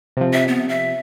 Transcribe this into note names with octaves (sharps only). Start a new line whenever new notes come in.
C3 F3
E5
B3
E5